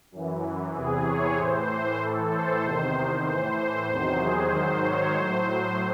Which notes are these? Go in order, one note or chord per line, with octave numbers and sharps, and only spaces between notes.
F#2 E3
E2 C3 E3 G#4
C#5
A2 E3 C5
A2 E3 A4
C5
E2 C3 D#3
A2 E3 C5
C5
E2 C3 D#3 F#3
G#4
G#2 D#3 F#3 C5
C#5
A2 F#3 C5